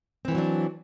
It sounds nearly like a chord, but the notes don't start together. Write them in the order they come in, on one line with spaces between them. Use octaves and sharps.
C4 E3 A3 F#3 D4